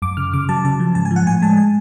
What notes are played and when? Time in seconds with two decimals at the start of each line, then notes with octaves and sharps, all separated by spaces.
0.02 F#2 D6
0.17 C#3 F6
0.33 C#3 D6
0.49 F#3 A5
0.65 C#3 A5
0.80 F3
0.95 G#2 A5
1.05 G#5
1.11 F3
1.16 F#5
1.26 A2 G#5
1.42 G#3 A5
1.57 G#5